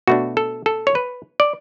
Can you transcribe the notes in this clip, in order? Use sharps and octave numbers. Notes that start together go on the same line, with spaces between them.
B2 A3 D4 F#4
A4
A4
C#5
B4
D5